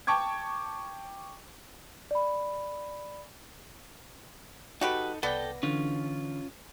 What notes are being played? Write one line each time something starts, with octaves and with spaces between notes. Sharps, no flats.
G5 A5 C#6 D6 G#6
D5 B5
D#4 F#4 G4 A4 B4 D#5
C2 B3 A4 D5 G5 A#6
D3 E3 C#4 F4